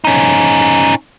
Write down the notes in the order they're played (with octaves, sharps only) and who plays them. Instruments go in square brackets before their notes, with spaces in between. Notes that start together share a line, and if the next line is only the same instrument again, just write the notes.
[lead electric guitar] C#4 D#4